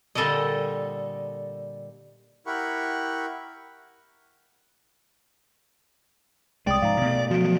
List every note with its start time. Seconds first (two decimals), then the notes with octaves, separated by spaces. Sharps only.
0.15 A#2 D3 G3 A4 D5 D#5
2.47 E4 G4 A#4 F#5 B5 C#6
6.67 C2 G#3 D5 G5 D#6
6.82 G#2 F3 F5 A#5
7.01 B2 A3
7.30 F3 F#3 F#4 D7